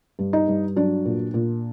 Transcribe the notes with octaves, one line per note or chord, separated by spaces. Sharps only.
G2
D#4
G2
F#3 D4
A#2
A#2